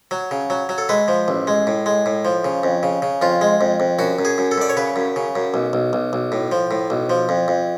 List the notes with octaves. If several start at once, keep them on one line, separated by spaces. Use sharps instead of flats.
F#3
C#3
F#3
F#3
A4
G#3 B4
F3
A1
G#3
A2
G#3
A2
F3
C#3
F2
C#3
C#3
F2 F4
G#3
F2
F2
F#2 F#4
F#2
G#4
F#2
A4
F#2 D5
C#5
C#3 B4
F#2
C#3
F#2
B1
B1
B1
B1
A2
F3
A2
B1
F3
F2
F2